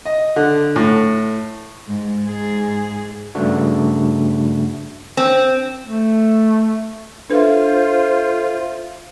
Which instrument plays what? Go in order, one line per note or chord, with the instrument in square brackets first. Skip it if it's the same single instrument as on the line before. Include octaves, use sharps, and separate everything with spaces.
[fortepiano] D#5
D3
A2
[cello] G#2 G#3
G#2 G#4
[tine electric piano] G2 C#3 A3 D4 F#4
[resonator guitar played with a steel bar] C4
[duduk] A3
[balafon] D4 B4 [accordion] F4 [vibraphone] A4 E5 [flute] C5